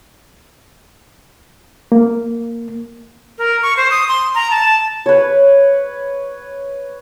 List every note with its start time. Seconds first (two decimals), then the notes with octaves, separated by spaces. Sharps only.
1.92 A#3
3.38 A#4
3.63 C#6
3.77 C5
3.91 D#6
4.08 C6
4.35 A#5
4.51 A5
5.06 B4 C#5